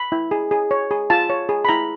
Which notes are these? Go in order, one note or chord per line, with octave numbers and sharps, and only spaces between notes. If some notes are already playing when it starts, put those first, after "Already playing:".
Already playing: B5
E4
G#4
G#4
C#5
G#4
F4 A5
C#5
G#4
B5
E4 A#5